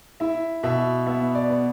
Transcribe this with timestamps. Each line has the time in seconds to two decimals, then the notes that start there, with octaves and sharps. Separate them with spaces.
0.20 E4 E5
0.63 B2 E5
1.06 B3 E5
1.35 D5
1.50 B3